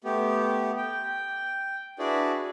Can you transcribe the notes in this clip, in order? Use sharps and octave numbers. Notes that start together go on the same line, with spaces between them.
A3 B3 G4
G5
D4 E4 F#4 G#4 B4 D5